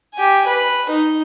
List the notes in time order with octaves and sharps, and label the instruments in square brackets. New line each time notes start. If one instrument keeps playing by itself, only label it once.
[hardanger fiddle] G4 G#5
B4
D#4